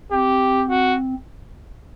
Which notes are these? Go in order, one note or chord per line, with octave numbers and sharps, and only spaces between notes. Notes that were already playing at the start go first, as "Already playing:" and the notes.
C4 G4
F#4